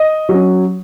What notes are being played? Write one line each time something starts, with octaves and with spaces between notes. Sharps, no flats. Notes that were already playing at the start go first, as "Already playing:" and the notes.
Already playing: D#5
F#3
C#4